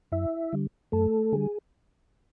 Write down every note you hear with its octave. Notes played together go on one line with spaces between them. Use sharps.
F#2 E4 E5
D3 G3
F#2 A3 A4
D3 G3 G#4